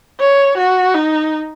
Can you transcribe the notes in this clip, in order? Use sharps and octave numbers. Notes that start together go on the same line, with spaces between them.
C#5
F#4
D#4